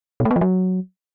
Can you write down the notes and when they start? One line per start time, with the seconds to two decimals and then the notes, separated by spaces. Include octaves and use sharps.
0.20 B2
0.25 A3
0.31 B3
0.36 F3
0.41 F#3